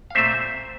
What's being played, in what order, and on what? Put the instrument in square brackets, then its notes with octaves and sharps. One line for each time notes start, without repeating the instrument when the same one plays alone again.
[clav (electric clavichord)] F5
A#2 A3 C4 C5 E5